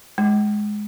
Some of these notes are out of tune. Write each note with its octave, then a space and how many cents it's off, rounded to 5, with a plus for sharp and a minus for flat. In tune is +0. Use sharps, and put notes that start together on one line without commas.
G#3 +10